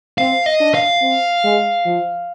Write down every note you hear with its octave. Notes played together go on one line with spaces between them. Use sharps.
C4 F5
D#5
D4
F5
C4
G#3
F3